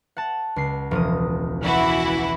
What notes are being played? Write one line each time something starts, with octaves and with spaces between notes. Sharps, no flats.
F#5 A5
C#2 C7
E1 F3 D#6
E3 E4 F#4